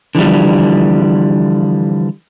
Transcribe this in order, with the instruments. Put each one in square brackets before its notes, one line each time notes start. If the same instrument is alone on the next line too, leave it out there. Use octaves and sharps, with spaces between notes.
[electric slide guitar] D3 E3 F3 G3